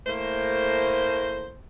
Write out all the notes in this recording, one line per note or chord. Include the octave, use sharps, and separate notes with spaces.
A2 A3 A#3 C5